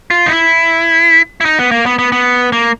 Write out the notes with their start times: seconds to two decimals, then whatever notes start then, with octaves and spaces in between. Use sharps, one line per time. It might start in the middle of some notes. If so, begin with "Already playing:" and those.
0.11 F4
0.26 D#4
0.30 E4
1.41 E4
1.45 D#4
1.59 B3
1.71 A#3
1.86 B3
1.99 B3
2.12 B3
2.52 A#3